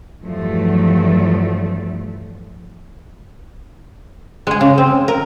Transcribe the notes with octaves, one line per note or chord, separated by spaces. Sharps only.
E2 G2 F3 F#3 A3
G#3 G#4
C#3
C4
A#4